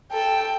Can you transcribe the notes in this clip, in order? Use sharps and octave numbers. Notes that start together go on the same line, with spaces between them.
A4 G5